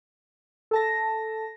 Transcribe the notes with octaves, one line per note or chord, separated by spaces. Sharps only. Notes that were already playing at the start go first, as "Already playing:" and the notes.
A4 A5 A#6